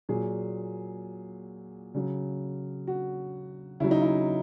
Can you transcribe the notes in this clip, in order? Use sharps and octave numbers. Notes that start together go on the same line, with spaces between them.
A#2 F#3 G#4
C#3 F#3
F#4
C#3 F#3 E4
D#4
E4